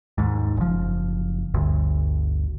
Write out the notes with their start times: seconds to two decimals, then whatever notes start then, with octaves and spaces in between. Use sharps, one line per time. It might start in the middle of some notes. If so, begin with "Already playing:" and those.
0.18 D#2 G#2
0.57 F#1 F3
1.54 G1 D2